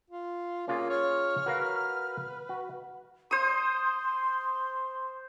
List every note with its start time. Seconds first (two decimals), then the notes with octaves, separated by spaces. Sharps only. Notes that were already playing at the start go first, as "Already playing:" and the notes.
0.10 F4
0.68 A#3 C#4 F4 G#4
0.90 C#5 F6
1.46 F#4 A#4 B4 F5
2.49 F#4
3.31 C5 C6 D#6